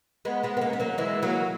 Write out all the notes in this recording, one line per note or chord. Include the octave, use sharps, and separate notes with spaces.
G#3 B3
G#3 B3
B3
A#3 C#4
B3
F#3 A#3
E3 G#3
F#3 A#3